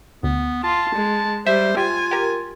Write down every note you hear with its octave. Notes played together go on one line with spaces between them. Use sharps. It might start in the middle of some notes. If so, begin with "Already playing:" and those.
D2 B3
F4 A5
G#3
G3 C5 E5
F4 G4 G#5
G4 A#4